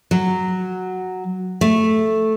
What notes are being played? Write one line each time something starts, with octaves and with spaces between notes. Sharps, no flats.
F#3
A3